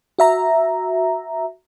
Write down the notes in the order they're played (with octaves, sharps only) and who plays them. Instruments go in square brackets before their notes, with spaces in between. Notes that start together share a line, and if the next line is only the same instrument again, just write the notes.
[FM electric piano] F#4 E5 A#5